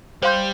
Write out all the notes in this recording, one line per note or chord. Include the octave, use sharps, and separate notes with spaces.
G3 C5 F5 C6 G6